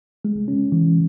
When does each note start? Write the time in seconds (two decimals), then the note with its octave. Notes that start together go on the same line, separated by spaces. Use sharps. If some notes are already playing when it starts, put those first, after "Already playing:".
0.25 G#3
0.48 C#4
0.72 E3